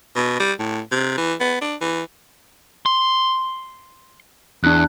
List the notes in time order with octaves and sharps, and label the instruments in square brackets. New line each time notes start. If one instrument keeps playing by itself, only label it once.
[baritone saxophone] B2
G3
A2
C3
E3
B3
D4
E3
[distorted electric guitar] C6
[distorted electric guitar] E2 [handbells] D4 F#6